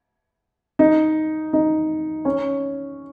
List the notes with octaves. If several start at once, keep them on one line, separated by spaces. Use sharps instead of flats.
D#4
D#4
C#4